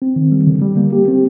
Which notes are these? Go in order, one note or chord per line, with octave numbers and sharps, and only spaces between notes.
C4
D#3
G3
D3
G3
A#3
G4
C4